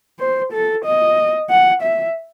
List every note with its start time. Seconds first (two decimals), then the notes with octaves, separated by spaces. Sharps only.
0.19 C5
0.52 A4
0.85 D#5
1.50 F#5
1.82 E5